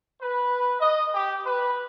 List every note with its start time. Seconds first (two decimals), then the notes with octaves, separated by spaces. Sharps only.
0.21 B4
0.80 D#5
1.14 G4
1.44 B4